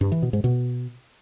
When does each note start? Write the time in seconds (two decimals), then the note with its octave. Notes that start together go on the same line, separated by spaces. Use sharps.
0.01 G2
0.12 E3
0.22 B2
0.33 G#2
0.44 B2